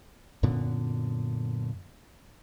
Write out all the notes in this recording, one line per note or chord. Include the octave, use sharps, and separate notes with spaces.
F#2 A#2 D3 B3